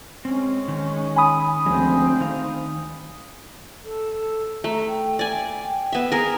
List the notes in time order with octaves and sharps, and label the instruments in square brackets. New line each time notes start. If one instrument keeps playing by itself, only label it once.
[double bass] G#3 C#4 [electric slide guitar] C4
[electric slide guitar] D#3
[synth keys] G#5 B5 D#6
[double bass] D2 C4 [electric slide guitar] F3 G#3 C#4
[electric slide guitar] D#3 D#4 F5
[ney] A4
[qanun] A3 [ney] A#5
[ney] G5
[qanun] D5 G#5
B3 E5
[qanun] G#4 A#4 [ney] A#5